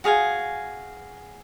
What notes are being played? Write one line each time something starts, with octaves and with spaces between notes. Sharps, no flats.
F#4 G#4 F5 G#5